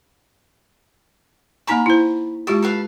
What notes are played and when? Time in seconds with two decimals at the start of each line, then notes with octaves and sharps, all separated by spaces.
1.67 A#3 D#4 G#5 A#5 B5 C#6
1.86 E4 C5
2.47 G#3 F4 G4 A5
2.62 A4 B4 F5